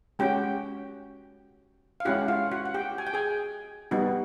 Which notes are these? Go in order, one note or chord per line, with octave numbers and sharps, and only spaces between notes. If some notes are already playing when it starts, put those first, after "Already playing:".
G#3 C#4 F#4 G4 G5
F5
G#3 C#4 E4 F#4 G4 F#5
F4 F5
F#4 F#5
F#5
G4 G5
G#5
G5
G#4 G#5
G3 B3 D#4 F#4